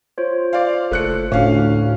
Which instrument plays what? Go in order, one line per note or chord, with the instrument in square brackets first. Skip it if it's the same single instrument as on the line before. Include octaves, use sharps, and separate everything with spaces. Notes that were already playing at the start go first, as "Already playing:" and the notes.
[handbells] F4 C5 C#5
[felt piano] D5 F5
[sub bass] F#1 [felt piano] A3 F#6 C#7
[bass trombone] D2 [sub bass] A2 [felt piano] C#4 F5